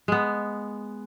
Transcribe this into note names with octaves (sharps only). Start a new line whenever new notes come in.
G#3 B3